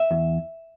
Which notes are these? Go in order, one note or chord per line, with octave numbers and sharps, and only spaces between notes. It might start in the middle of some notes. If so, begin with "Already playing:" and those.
Already playing: E5
E2